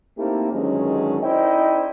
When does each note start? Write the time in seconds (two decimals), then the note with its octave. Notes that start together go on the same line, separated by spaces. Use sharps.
0.18 A3 A#3 C4 D#4 E4 G4
0.52 G2 D3 D#3 F#3 G#3 C#4
1.22 D#4 E4 C5 D5 D#5 G5